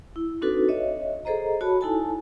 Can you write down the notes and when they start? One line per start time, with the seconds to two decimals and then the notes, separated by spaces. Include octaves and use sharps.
0.16 E4
0.41 C4 D4 D#4 F#4 A4 B4
0.68 C#5 D#5 E5
1.25 G#4 A4 C5 D#5 A#5
1.61 F#4 C#5 A5 B5
1.81 D#4 E4 A4 G#5 A5